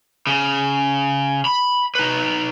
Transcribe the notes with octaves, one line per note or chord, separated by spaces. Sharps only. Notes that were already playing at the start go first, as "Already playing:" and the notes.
C#3
B5
D#4 B4